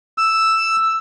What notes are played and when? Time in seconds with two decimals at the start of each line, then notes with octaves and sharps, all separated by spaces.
0.18 E6